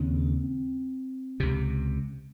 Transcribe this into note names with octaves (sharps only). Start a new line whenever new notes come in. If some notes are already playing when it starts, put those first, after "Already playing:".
Already playing: D#2 C#3 C4
C#2 C3